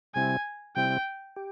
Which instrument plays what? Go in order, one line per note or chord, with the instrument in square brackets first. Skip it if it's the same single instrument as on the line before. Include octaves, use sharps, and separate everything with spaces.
[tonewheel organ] C3 G3 C4 E4 [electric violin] G#5
[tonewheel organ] C3 G3 C4 E4 [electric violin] G5
[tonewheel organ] G4